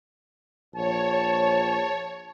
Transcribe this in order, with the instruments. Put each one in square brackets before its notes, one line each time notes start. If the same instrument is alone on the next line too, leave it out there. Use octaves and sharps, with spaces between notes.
[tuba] A#1 [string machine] C#5 [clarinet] A5